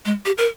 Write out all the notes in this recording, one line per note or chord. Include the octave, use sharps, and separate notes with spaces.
G#3
G4
A#4